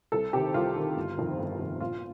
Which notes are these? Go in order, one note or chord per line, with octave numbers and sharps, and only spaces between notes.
C2 A4
C3 D#3 G4
C2 F4
C3 D#3
G1
F2 C3 D#3
G1
F2 C3 D#3
A#1 F4